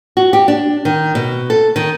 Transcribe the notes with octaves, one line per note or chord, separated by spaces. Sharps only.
F#4
G4
D4
D#3
B2
A4
D#3